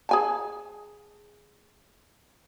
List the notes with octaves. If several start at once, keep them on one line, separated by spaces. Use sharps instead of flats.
G#4 G#5 A5